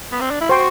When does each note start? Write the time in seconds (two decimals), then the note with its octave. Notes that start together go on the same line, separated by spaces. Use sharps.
0.12 B3
0.21 C4
0.31 D4
0.41 E4
0.49 F#4 C5 G5 C6